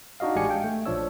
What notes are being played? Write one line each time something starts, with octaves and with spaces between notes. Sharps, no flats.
D4 D#4 F#4 D#5 F5
A1 G#3 D4 G4 G#5 C#7
F5 G5
A3
A#1 F3 D4 C#5 E6